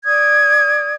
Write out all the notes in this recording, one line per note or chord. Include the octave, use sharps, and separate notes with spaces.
D5 D#6 G#6